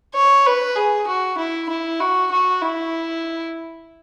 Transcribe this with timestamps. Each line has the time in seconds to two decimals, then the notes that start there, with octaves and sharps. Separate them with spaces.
0.15 C#5
0.46 B4
0.76 G#4
1.08 F#4
1.38 E4
1.69 E4
2.00 F#4
2.32 F#4
2.62 E4